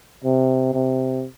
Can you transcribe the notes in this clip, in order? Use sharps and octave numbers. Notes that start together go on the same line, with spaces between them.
C3
C3